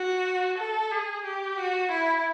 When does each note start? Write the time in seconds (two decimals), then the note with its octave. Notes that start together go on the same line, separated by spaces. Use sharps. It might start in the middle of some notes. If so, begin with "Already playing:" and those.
Already playing: F#4
0.58 A4
0.91 G#4
1.25 G4
1.58 F#4
1.92 E4